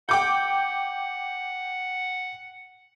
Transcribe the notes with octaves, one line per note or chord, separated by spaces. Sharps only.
F#5 G5 D6 G6